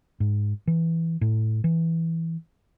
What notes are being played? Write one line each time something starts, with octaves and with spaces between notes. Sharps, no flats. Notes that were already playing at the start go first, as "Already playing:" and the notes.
G#2
E3
A2
E3